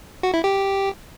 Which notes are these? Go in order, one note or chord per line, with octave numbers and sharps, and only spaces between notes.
F#4
E4
G4